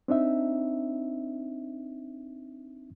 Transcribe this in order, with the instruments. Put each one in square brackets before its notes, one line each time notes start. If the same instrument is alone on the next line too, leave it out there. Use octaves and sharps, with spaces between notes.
[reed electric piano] C4 D4 D#4 E5